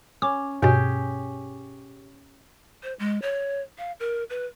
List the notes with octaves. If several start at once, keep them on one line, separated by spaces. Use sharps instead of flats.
C#4 D6
G2 B2 C#4 G4 G#4
C5
G#3
C#5
F5
A#4
B4